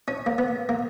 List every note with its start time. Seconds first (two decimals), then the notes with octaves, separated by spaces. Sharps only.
0.08 C#4
0.26 A#3
0.38 B3
0.69 A#3